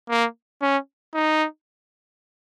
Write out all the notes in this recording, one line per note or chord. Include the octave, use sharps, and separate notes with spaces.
A#3
C#4
D#4